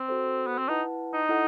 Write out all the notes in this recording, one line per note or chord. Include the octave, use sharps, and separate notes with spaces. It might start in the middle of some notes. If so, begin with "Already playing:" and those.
Already playing: C4
F#4 A4 C5
B3
C4
D#4 E4 B4 F#5 A5
D#4
E4 A4 D#5 F#5